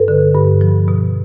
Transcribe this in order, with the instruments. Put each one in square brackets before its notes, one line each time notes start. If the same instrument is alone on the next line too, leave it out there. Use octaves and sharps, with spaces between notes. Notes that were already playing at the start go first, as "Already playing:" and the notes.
Already playing: [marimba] G2 A4 B4
D3
G2
F3
B2